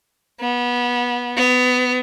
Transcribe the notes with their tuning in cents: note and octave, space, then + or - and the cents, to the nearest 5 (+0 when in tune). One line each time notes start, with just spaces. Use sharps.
B3 -20
B3 +25